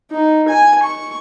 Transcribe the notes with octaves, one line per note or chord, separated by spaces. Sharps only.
D#4
G#5
C#6